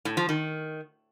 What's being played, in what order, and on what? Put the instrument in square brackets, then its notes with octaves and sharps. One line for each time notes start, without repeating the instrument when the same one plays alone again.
[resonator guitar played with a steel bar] A2
F3
D#3